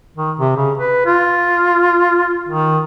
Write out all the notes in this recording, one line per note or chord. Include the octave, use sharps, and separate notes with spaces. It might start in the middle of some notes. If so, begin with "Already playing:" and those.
D#3
C3
C#3
B4
F4
D#3